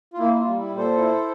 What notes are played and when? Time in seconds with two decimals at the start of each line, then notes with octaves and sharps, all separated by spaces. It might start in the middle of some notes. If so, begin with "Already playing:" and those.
0.14 F4
0.18 A#3 E4
0.34 E4
0.38 F4
0.44 G3
0.58 E4
0.71 A#2
0.77 A4 C5
0.97 E4